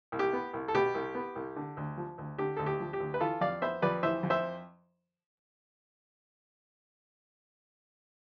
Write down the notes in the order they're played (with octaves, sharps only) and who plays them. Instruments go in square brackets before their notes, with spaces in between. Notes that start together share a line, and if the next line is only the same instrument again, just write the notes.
[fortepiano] C2
G4
B3
C2
A4
B2 G4
C2
B3
C2
D3
D2
F3
D2
D3 G4
D2 A4
G4
F3
G4
D2
B4
E3 F4 A4
F2 D5 F5
B3 C5 E5
F2 B4 D5
E3 C5 E5
F2
C5 E5